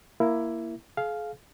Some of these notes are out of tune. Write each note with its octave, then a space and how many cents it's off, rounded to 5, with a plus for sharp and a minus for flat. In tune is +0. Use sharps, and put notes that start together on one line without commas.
A#3 +0 E4 +10
G#4 +40 F5 +0